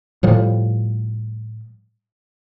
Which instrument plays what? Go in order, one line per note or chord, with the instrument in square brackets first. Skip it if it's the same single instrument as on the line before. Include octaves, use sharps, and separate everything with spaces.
[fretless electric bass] A2 F3 G3